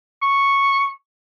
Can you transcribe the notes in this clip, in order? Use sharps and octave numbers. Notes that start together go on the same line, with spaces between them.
C#6